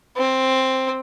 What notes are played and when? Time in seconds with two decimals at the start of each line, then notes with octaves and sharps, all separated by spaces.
0.17 C4